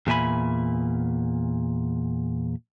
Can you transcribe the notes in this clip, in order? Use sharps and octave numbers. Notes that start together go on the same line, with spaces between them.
E2 A#2 E5 G#5 B5